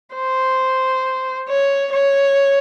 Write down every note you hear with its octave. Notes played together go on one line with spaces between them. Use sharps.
C5
C#5
C#5